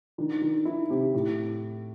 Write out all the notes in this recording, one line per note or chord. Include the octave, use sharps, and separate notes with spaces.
D#3 D4
D#3
D#3 E4
C3 G4
A2